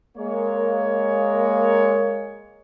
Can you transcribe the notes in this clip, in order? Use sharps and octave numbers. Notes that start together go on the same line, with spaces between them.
G#3 A#3 C#5